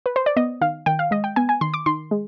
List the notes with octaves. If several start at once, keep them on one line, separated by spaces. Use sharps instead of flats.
B4
C5
D5
B3 D#5
D#3 F5
D#3 G5
F5
G#3 D#5
G5
B3 G#5
G#5
D#3 C6
D6
D#3 C6
G#3